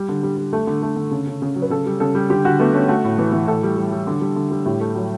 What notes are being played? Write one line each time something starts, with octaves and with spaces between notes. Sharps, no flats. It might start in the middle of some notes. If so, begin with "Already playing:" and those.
Already playing: G3
D3
G3
G3
A3 A4
D3
A3
D3
C#3
C#3
C#3
F#3
B4
C#3 A4
G3
C#3 A4
G3
D3 G4
D3 F#4
A3 B3
A3 C#4
A3 F#4
A2
E3
E3
A2 A4
G3
G3
G3
D3
G3
D3
G3
A2 G4
A3
F#3